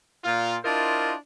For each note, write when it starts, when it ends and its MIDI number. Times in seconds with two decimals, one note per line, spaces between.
0.24 0.56 46
0.24 0.56 65
0.64 1.13 62
0.64 1.13 64
0.64 1.13 65
0.64 1.13 70
0.64 1.13 72
0.64 1.13 75